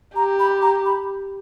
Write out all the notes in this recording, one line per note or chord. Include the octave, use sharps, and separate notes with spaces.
G4 A#5
B5
A#5
B5